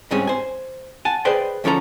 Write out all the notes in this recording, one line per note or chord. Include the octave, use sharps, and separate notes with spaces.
G#2 C#3 G3 C4 C#4 G#4
C5 G#5
F#5 G#5 A5
G#4 B4 C5 D5 D#5 G5
D2 F3 C#4 A4 A#5